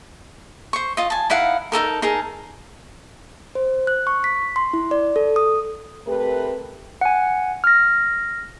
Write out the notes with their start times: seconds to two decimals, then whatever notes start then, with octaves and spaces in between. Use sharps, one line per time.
0.73 C5 C#6
0.97 F4 D#5
1.10 G#5 A5
1.30 D#4 E4 F5 F#5
1.72 D#4 F#4 A4 A#4
2.02 D#4 G#4 A#4 A5
3.55 C5
3.87 F#6
4.07 C#6
4.24 B6
4.56 C6
4.73 E4
4.91 D5
5.16 A4
5.36 D#6
6.07 C3 A3 G4 A#4 B4
7.01 F#5 G#5
7.64 F6 A#6